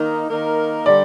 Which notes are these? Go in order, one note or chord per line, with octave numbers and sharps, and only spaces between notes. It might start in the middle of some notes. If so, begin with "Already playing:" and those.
Already playing: D#3 A#3 D#4 A#4
D#3 A#3 D#4 A#4
D3 G3 D5